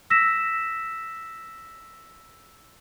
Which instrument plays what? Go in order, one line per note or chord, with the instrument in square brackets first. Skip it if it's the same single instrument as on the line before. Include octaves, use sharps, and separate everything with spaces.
[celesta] E6 A#6 B6 E7